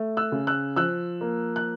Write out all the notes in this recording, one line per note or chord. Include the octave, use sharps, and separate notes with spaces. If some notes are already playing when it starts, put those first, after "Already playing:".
Already playing: A3
E6 F#6
C#3
E6 F#6
F3 E6 F#6
A#3
F#6